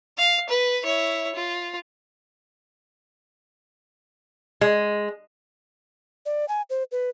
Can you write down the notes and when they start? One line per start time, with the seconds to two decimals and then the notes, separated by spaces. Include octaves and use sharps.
0.18 F5
0.49 B4
0.83 E4 C#5
1.35 F4
4.61 G#3
6.26 D5
6.48 G#5
6.70 C5
6.92 B4